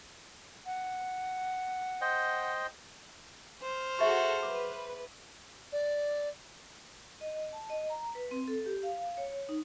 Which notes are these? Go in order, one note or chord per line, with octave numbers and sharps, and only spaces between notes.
F#5
C5 D#5 G5
C5 F6
F#4 G#4 A4 E5 C#6
B4 D6
D5
D#5
A5
D#5
A#5
B4
C4
A4
G4
F5
C#5
D#4